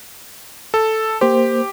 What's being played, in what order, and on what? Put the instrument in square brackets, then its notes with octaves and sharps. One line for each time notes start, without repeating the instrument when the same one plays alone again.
[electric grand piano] A4
[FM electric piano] A#3 C5 [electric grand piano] G4